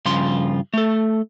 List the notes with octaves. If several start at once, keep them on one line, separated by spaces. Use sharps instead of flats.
G2 C#3 F3 F4 C6
A3 A4